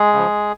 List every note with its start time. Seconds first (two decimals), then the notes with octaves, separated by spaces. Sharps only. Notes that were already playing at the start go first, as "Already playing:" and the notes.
Already playing: G#3 G#4
0.13 C#3 F3